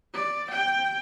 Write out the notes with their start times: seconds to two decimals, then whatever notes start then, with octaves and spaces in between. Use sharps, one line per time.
0.14 D5
0.51 G5